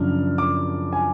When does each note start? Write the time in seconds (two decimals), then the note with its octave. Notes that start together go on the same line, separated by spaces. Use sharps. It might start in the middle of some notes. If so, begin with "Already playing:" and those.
Already playing: F#2 C#3 F3 D4 F6
0.38 D6
0.93 G#5